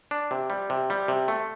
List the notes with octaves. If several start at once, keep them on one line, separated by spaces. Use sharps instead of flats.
D4
C3
G3
C3
G3
C3
A3